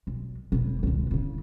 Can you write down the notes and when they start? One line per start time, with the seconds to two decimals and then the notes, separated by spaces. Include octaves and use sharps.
0.07 B1
0.52 E1 B2
0.83 C#2 D3
1.11 E2 C#3